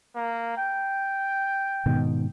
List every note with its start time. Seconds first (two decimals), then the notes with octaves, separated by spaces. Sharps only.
0.15 A#3
0.57 G5
1.86 G#2 B2 D#3